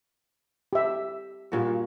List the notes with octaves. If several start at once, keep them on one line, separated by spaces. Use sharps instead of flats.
G4 E5
G2 A#2 F#4